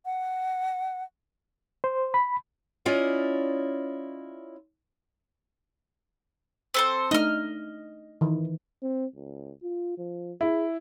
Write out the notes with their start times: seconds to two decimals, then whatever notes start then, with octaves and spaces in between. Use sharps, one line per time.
0.05 F#5
1.84 C5
2.14 B5
2.85 C#4 E4 F4 D5 D#5
6.74 C4 A4 C5
7.11 A3 D4 D#4 D#5 F6
8.21 D#3 E3
8.82 C4
9.16 C#2
9.63 F4
9.98 F3
10.41 E4 G#4